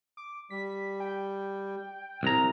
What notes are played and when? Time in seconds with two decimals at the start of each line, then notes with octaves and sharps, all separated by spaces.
0.17 D6
0.50 G3 B6
1.00 G5
2.23 C2 A#5